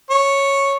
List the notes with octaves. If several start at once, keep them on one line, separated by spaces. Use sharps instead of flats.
C#5